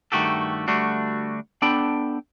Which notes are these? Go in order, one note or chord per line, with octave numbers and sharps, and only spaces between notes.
G2 D#3 A3 F#4 G4 A4
D2 G3 A3 D4 F#4
B3 D4 A4 G5 B5